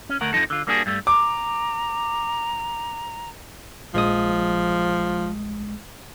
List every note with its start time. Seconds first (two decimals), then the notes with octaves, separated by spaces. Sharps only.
0.09 C#4
0.21 D2 A3 A#4 F#5
0.33 F2 C#3 F3 D#4 A4
0.50 D3 F4
0.67 G3 A#3 D4 F#4 G#4
0.86 G2 G3 A3
1.07 A#5 D6
3.94 A#1 F3 G#3 D#6